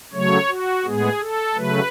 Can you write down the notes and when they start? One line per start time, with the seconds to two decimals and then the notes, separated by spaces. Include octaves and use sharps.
0.13 C#3 F#3 A3 C#5
0.49 F#4
0.84 A2 G#3 B3 G#4
1.20 A4
1.55 C#3 F#3 A3 B4